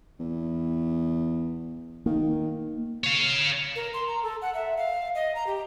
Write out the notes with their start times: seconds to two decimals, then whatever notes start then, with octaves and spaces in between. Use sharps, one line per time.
0.20 E2
2.06 D#3 A#3
3.04 C#5 F5
3.76 A#4
3.94 C6
4.07 A#5
4.23 A4
4.42 F#5
4.54 E5
4.77 F5
5.15 D#5
5.35 A#5
5.47 G4